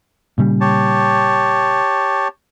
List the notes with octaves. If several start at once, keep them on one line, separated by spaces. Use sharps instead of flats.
A#2 C#3 G3
G4 C#5 A5